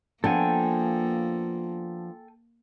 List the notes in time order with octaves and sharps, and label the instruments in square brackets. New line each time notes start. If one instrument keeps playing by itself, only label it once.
[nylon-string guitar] F3 B3 D4 [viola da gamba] A#3 [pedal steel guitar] A4 G5 G#5